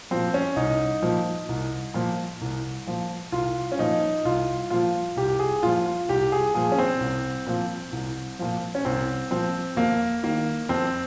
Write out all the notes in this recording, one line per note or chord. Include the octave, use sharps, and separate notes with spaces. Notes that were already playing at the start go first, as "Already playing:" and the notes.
A#2 F3 C4
C#4
C2 D#4
A#2 F3
C2
A#2 F3
C2
A#2 F3
C2 F4
C#4
A#2 F3 D#4
C2 F4
A#2 F3 F4
C2 G4
G#4
A#2 F3 F4
F4
C2 G4
G#4
A#2 F3 G#4
C#4
C4
C2
A#2 F3
C2
A#2 F3
C#4
C2 C4
A#2 F3 C4
F2 A#3
D#3 A#3
F2 C4